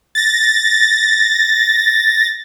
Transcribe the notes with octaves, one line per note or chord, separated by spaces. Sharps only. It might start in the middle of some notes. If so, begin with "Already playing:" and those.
A6 A#6